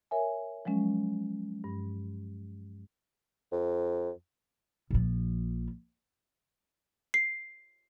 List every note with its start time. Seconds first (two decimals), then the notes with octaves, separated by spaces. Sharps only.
0.11 A#4 C#5 E5 G#5
0.65 F3 F#3 G#3 C#4
1.64 G2
3.52 F2
4.91 A#1 F3
7.14 C7